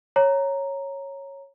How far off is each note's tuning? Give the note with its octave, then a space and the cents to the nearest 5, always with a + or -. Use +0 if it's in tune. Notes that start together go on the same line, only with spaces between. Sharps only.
C#5 -5 A#5 +0